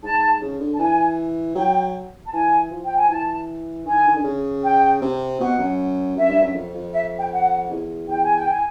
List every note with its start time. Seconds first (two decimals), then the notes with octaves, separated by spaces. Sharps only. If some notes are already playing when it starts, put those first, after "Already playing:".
0.03 G#2 A5
0.42 C#3
0.60 D3
0.74 A5
0.79 E3 G#5
1.55 F#3 G5
2.26 A5
2.32 E3 G#5
2.71 F3
2.83 G5
2.96 G#5
3.09 E3 A5
3.86 D#3 G#5
4.08 D#3
4.16 D3
4.24 C#3
4.63 G5
5.01 C3
5.40 B2 F#5
5.58 F#2
6.17 F#2 E5
6.29 G2
6.41 F#2
6.55 F2
6.74 F2
6.93 E5
7.18 G5
7.31 F#5
7.70 E2
8.08 E2 G5
8.22 G#5
8.36 G5
8.49 G#5